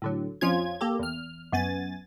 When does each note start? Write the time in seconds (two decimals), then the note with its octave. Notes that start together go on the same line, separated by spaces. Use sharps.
0.02 A2 D3 F#3
0.41 F2 F3 C#4 F4 G#6
0.81 A#3 G4 A4
0.99 E2 F6
1.52 F#2 B3 G#5 A6